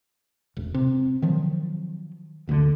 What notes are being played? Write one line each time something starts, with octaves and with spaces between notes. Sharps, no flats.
E1 A1
C3
D#3 F3 F#3
F#1 D2 A2 D3